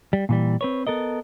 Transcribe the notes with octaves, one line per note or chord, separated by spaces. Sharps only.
G3
A#2 E3 G3
C4 B4 C#5
B3 A4 A#4 D#5